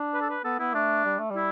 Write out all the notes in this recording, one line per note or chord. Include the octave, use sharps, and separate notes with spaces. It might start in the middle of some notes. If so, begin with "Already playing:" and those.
Already playing: D4
B4
A4
B4
B3 A4
B3 E4
A3 D4
G3
A3
G3
E4